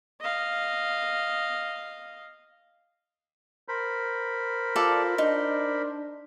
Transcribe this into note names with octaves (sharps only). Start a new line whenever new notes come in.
D#5 F5
A#4 C5 B5
F4 A4 D5 F5
D4 D#4